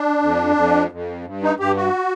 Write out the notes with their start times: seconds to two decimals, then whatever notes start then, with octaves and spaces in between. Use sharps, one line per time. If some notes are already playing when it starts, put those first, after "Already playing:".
Already playing: D4
0.22 F2
0.56 F2
0.91 F2
1.26 G2
1.43 D#4
1.60 G2 G4
1.76 F#4